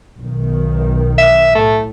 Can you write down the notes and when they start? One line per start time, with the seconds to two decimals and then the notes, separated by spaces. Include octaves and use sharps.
0.18 B1 D#3
1.18 E5
1.55 A2 A3